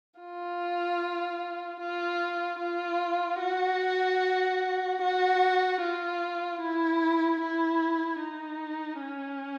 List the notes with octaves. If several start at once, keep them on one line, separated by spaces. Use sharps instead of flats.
F4
F4
F4
F#4
F#4
F4
E4
E4
D#4
C#4